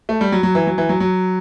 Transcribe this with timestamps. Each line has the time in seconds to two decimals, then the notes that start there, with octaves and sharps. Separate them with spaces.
0.09 A3
0.21 G3
0.32 F#3
0.43 F#3
0.55 E3
0.67 F#3
0.78 E3
0.89 F#3
1.00 F#3